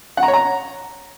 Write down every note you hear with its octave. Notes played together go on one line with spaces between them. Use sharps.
F#5
A#5
C#5
A#5